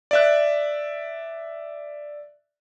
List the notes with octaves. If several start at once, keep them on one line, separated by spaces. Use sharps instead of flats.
D5 E5 F#6